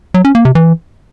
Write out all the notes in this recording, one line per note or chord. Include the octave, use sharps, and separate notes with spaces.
F#3
C#4
A#3
C3
E3